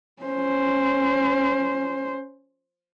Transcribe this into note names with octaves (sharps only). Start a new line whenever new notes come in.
C#4 C5